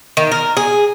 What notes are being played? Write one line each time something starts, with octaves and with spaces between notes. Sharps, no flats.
D#3
A#4
G#4